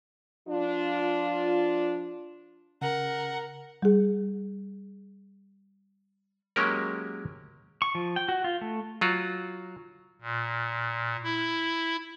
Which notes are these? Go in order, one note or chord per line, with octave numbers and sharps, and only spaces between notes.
F3 D4 F4
C#3 A#4 F#5
G3 G#4
F#3 G#3 A#3 C#4 G4 A#4
C#6
F3
G5
F#4
F4
A3
F#3 F4 F#4
A#2
E4